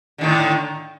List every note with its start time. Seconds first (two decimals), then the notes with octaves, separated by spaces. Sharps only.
0.18 D3
0.21 D#3
0.23 A2